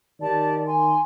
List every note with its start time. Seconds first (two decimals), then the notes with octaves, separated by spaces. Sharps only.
0.20 D#3 G4 D5 A5
0.67 G#5 C6